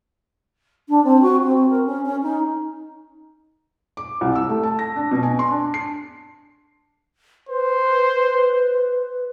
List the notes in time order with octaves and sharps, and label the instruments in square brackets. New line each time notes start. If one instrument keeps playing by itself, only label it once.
[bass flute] D4
C4
F#4
C4
A#4
C#4
C#4
D#4
[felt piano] D6
C2
E6
A3
A5
A#6
D4
B2
G#5
C6
D4
C7
[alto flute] B4 [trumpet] C5